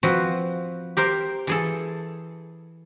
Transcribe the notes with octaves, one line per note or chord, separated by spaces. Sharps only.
F3 C4 F#4 B4
G4 A#4 C5
E3 G#4 A4